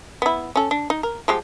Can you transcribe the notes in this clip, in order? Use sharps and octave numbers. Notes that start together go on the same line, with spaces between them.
B3 E4
C#4 A4
D4
D#4
A#4
F3 G#3 G4